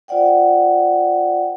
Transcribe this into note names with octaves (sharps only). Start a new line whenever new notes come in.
F4 C5 D5 F#5 G5